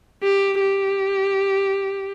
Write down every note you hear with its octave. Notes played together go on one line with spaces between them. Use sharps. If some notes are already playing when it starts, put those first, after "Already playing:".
G4
G4